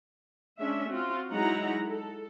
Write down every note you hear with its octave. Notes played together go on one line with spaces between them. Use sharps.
G#3 C#4 D4 E5
C4 F4 F#4
F#3 G#3 D#4 E4 F#5 A#5
A4